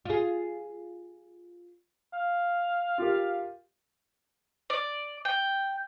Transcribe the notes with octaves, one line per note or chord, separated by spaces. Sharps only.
F4 G#4
F5
F4 G4 A#4
D5
G5